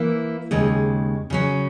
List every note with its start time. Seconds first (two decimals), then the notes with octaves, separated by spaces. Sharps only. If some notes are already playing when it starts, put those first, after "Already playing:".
Already playing: E3 A#3 E4
0.51 D#2 C#3 G#3
1.30 C#3 F#3 C#4